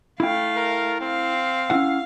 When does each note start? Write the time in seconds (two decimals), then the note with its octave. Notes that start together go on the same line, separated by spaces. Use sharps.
0.20 A3 E4 F5 G5
0.56 A#4
1.01 C4 F5
1.70 C#4 E4 F#5